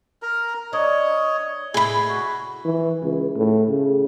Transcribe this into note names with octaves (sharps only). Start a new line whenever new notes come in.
A#4 A#5
D4 C#5 D#5
A2 C3 E4 G#4 B5
F#4
E3
C#2
A2
C#3